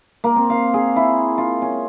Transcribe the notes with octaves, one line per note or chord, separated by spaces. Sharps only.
A#3
C4
F5
G#4
E4
F4
C#4